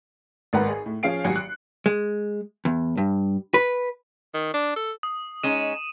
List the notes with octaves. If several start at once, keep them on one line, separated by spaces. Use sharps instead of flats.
G#1 G#2 A#4 B4 F#5
G#4
A2
F3 C#4 G#4 F5 C7 D7
G#1 F#3 F#4 G4 G#5 C#7
F#6
G#3
E2
G2
B4
D#3
D4
A4
D#6
G#3 C#4 D#4 D#6 D#7 E7